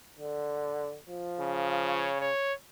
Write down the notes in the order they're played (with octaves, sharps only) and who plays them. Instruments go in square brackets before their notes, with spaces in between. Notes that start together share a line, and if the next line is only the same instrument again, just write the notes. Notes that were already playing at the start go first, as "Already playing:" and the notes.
[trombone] D3
F3
[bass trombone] C#3
[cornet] C#5
C#5